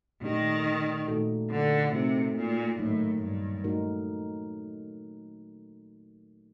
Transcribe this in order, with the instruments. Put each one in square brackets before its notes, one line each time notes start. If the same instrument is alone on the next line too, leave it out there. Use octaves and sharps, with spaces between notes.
[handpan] A#2 A3 D4 G4 A#4 [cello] D#3
[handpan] A#2 A3 D#4 F#4 A4
[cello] D3
[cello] C3 [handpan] A3 D#4 F#4 A#4
[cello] A#2
[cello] A2 [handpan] D#3 F#3 A#3 D#4
[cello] G2
[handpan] A3 D#4 F#4 A#4